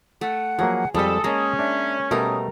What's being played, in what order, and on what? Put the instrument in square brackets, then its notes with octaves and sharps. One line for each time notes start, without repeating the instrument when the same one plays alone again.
[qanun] A3 [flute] F#5
[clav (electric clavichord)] F3 F#3 A#3 [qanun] G#4
[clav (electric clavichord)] F2 G3 [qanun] G#3 E5 [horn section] A4 [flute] D#6
[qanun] G#3 A#3 [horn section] C#4 [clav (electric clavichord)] D#5 A5 A#5
[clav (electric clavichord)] D4 [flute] E5
[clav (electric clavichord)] B2 A3 [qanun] G3 A#4 [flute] D#6